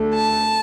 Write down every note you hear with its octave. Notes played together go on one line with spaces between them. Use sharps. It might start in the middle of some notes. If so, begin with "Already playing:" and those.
Already playing: D2 D3 A3
A5